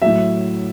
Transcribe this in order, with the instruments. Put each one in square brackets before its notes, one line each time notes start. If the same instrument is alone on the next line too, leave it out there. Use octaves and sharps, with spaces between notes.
[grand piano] A2 F#3 E5